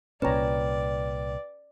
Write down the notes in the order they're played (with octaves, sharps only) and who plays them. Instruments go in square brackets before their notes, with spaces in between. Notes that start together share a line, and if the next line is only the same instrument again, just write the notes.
[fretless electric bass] C2 A#2 [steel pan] C#4 C#5 A#5 [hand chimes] B4 G5 [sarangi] D5